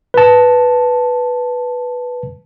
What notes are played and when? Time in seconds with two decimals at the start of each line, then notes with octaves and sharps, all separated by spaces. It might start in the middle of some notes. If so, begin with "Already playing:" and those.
0.14 B4 A5